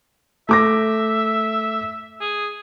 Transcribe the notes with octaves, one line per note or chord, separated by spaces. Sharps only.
A3 E5 D6 A#6
G#4